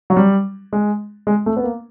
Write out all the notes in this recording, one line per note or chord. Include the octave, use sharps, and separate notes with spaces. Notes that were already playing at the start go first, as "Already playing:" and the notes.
F#3
G3
G#3
G#3
A3
B3
A#3